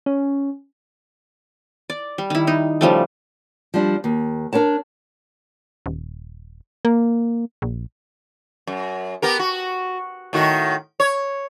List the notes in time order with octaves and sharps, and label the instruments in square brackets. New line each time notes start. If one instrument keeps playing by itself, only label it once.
[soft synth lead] C#4
[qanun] D5
G3
D#3 E4
D#4
C#3 F3 G3 A3
[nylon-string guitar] F3 G3 D4
D#2
D4 A#4 C#5 A5
[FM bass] D#1
A#3
A#1
[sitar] F#2
B3 G4 A#4
F#4
A2 D#3 F#4
C#5